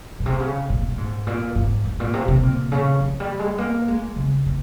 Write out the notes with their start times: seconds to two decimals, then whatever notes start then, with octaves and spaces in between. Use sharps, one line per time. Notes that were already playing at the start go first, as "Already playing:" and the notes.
0.20 A#2
0.26 C3
0.40 C#3
0.70 A#2
0.91 A#2
0.98 G#2
1.27 A#2
1.55 G#2
1.85 G#2
2.00 A#2
2.14 C3
2.28 C3
2.43 A#2
2.72 C#3
3.00 F3
3.20 G3
3.39 G#3
3.58 A#3
3.88 G#3
4.16 C#3
4.46 D#3